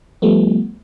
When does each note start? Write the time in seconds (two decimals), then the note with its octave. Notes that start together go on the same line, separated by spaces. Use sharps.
0.22 F3 G3 A3 B3